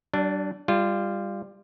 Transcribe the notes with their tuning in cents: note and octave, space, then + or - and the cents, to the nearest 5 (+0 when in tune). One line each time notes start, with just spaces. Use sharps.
G3 -45 D4 +0
G3 +15 F4 -15